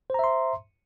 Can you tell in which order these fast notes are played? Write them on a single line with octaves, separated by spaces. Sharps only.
C5 A#5 E5 C6